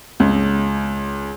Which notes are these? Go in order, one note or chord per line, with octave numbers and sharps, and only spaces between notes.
C#2